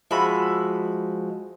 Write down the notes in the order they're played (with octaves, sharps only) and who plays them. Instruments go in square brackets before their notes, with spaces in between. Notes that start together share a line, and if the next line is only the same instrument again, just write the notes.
[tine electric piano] F3 G#3 F#4 [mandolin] E5 B5